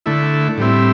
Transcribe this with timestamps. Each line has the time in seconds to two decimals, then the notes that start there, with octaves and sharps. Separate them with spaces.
0.06 D3 A3 E4
0.58 A2 G3 C4 E4